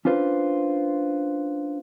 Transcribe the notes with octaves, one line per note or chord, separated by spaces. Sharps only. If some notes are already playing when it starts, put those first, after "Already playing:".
C#4 D4 F4 B4 C5